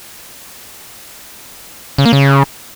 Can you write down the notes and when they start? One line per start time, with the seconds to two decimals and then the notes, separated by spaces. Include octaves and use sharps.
1.98 C#3
2.06 A#3
2.13 C#3